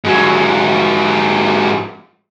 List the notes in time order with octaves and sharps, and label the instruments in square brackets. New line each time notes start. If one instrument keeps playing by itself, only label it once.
[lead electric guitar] G#2 F#3